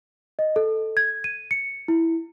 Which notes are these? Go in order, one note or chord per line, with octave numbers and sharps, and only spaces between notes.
D#5
A4
G#6
D#7
C#7
E4